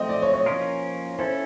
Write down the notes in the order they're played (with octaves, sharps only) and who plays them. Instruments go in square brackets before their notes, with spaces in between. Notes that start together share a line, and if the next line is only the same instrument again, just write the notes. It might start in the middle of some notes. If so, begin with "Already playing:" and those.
Already playing: [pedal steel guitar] F3 A3 C4 [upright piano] D#5
[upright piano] D5
C#5
C#5
[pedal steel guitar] F3 A#3 C#4 F4 A#4
[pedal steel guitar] C#4 E4 A4 [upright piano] C5